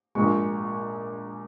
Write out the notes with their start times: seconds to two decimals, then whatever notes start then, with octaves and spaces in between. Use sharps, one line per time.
0.15 A#1 A#2 G#3 C#6